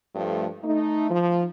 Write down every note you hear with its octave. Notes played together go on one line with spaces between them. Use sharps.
G2 F3 A3
A3 D#4
F3